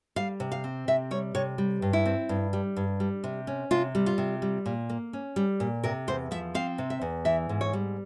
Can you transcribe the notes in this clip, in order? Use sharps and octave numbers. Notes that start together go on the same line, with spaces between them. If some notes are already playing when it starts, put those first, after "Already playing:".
G3 F5
C3
F5
C4
C3 E5
G3 C#5
C3 C#5
G3
G2
E4
C4
G2
G3
G2
G3
C3
C#4
C3 F4
G3
F4
C3
G3
A#2
A#3
C#4
G3
A#2
C3 A#4
E2 C5
F3 E5
C4 F5
C3
E5
E2
E3 E5
G#2
C#5
G3